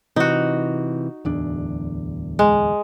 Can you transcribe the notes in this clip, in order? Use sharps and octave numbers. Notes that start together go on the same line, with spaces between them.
C3 E3 D#4 F#4
D1 E2 D4
G#3